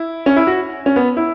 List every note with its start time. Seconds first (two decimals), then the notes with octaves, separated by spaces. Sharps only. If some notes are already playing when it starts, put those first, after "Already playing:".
Already playing: E4
0.26 C#4
0.36 E4
0.47 F#4
0.86 C#4
0.96 B3
1.17 E4